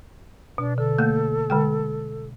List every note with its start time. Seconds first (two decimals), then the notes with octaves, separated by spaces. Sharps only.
0.58 B2 D4
0.78 D3 A4
0.98 A3 A#3 G6
1.50 D3 G#3 G5